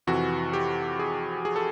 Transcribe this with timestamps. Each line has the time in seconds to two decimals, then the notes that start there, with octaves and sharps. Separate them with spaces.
0.07 F2 C3 E3 F#4
0.53 G4
0.99 G#4
1.45 G#4
1.56 A4